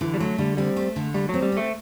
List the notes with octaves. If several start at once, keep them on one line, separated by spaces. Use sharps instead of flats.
D3 E3
G3
F#3 A3
D3 G3
G3 C4
A3
D3
G3 A3
F#3 C4
G3
A3 C4